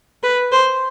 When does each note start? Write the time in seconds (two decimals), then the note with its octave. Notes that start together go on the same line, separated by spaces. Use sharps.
0.23 B4
0.52 C5